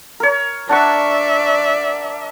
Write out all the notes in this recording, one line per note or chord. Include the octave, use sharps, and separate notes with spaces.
A#4 C#5
D4 D5 E5 F#5 C#6